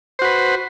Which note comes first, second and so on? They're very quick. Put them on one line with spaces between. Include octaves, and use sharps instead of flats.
C5 F#4 B4